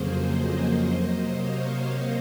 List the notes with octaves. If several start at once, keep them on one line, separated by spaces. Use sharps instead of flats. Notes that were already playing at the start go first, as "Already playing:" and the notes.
Already playing: F2 C#3 F#3 A#3 G#4 C5
C5 D#5
C5 D#5
C3 F#3 A#3
C#5 F5